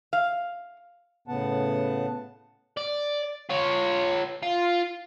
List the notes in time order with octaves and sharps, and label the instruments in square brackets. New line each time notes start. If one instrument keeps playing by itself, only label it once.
[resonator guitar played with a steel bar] F5
[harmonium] A2 C#3 B3 F#5 A5
[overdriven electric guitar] D5
F4 C#5
F4